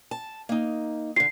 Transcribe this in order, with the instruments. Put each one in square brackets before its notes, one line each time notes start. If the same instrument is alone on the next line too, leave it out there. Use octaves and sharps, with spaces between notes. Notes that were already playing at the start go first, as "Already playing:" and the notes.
[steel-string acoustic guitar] A5
A#3 D#4
[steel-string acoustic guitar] D3 F4 [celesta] C7